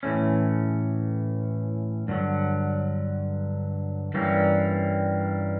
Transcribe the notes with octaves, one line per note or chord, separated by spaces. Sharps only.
A2 E3 A3 C#4
G2 D3 F#3
G2 E3 G3 A#3 C#4